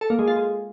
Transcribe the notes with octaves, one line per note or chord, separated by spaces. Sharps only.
A4
A#3
G#3
F4
G#3